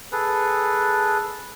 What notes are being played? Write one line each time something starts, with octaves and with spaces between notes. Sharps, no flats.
G#4 A4 B4